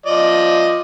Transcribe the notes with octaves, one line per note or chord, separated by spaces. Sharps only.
F3 D5 D#5